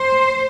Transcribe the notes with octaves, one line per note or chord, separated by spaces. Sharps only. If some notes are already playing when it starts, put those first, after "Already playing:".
Already playing: C5